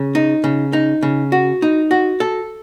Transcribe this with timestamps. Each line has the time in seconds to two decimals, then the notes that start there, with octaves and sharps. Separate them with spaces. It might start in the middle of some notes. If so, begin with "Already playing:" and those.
Already playing: C#3
0.15 D#4
0.44 C#3
0.73 D#4
1.03 C#3
1.32 F#4
1.62 D#4
1.91 F#4
2.20 A4